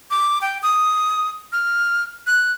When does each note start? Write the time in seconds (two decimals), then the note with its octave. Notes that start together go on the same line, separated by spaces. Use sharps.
0.11 D6
0.42 G5
0.63 D#6
1.52 F6
2.27 F#6